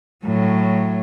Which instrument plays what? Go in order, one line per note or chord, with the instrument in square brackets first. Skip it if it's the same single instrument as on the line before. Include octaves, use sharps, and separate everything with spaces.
[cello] A2 F#3